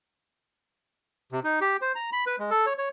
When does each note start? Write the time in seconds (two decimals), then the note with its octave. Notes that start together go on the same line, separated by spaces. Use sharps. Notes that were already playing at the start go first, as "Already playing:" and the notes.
1.32 C3
1.44 D#4
1.61 G4
1.81 C5
1.95 A#5
2.12 B5
2.27 B4
2.39 G#3
2.51 A4
2.66 C#5
2.78 C#5